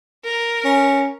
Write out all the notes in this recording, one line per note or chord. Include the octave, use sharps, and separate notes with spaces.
A#4
C#4